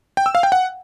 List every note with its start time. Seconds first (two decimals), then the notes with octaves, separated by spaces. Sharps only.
0.17 G5
0.26 E6
0.35 F5
0.43 G5
0.52 F#5